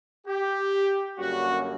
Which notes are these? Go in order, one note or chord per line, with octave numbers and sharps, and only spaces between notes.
G4
F#2 D3 G3 A#3 C#4 F#4